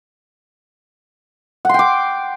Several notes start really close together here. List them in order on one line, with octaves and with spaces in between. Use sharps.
F#5 C6 G5 D6